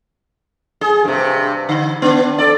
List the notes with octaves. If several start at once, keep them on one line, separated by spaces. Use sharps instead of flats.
G#4
G2 C3
D3
B3 D4
A4 D5